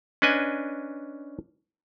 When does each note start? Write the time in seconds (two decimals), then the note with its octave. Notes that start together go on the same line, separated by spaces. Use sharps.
0.22 C#4 D4 B4 D#5 G#5